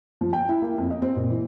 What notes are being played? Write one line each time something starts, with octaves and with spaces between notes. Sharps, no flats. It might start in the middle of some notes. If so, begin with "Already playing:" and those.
F3
G5
E4
A#3
F2
D#5
C4
A#2
E3